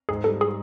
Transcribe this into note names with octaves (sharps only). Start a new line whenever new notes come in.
G#2 G#4
G3 A4
G#4